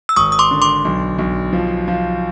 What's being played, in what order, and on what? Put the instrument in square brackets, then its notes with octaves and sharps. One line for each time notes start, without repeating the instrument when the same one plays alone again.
[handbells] E6
[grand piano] G#1 [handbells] C#6 D#6
[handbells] D#6
C6 D6
[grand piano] D3
[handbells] C6 D6
[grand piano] B1
B1
F3
F3